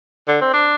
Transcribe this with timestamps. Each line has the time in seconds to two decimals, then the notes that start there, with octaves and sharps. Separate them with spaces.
0.28 D3
0.41 C4
0.53 D4